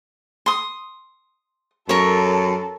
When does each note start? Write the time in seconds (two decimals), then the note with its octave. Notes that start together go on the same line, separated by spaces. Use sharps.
0.46 C6 D#6
1.89 F#2 A4 A#4 C#5 A5